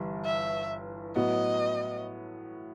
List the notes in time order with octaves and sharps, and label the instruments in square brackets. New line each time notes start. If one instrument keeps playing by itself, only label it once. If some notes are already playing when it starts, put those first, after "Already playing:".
Already playing: [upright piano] G1 G2 E3 G3
[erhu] E5
[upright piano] A2 F#3 B3 [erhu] D#5